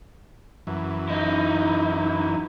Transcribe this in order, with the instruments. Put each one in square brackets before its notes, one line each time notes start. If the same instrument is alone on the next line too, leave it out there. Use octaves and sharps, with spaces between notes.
[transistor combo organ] F#2 E3
[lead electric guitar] D#4 E4